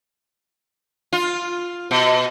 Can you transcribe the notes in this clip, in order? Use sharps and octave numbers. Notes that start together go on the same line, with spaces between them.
F4
B2